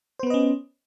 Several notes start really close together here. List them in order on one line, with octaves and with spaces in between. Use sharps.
C5 B3 B4 D#5 C#4